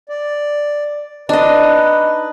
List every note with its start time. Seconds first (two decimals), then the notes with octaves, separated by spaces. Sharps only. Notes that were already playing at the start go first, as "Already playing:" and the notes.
0.09 D5
1.29 D4 D#4 B4 D#5